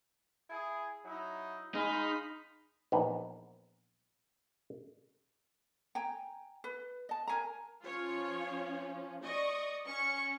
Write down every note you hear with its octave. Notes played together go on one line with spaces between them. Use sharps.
E4 G#4
F#3 D#4 E4
G#3 D#4 F5 B5 C6
A#1 E2 B3 D#4
G5 G#5 A#5
B4
D#5 A5
A#4 G#5 A#5
F3 C#4 F4 C#5
D5 D#5 C#6 D#6
C#4 C#6